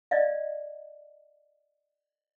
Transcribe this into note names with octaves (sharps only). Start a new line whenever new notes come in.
D5 D#5 F5